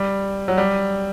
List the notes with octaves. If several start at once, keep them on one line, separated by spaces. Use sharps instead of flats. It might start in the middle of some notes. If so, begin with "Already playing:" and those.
Already playing: G3
F#3
G3